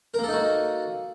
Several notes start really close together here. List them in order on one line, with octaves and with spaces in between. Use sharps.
A#4 A#3 A4 D#4 F#4